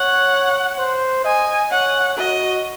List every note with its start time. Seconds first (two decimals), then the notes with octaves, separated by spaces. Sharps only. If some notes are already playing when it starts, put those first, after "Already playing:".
Already playing: C#5 F#5
0.79 C5
1.24 D#5 G#5
1.72 C#5 F#5
2.18 F#4 D#5